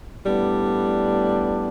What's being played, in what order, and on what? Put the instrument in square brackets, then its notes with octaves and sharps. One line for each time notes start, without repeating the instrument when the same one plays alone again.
[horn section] A2 G3 B3 D4